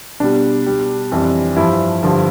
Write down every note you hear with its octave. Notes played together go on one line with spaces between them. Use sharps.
B2 G3 D4
B2 G3
F2 E3 G3
G2 F3 E4
G2 D3 F3